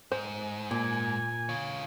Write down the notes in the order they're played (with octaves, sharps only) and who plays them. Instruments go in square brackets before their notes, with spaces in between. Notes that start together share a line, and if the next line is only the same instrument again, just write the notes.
[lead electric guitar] G#2 [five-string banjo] C5
[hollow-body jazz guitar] A#2 [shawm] G#5
[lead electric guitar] F4 C#5